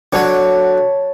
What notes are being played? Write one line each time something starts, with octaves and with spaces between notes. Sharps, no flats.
D3 F#3 C#5 A5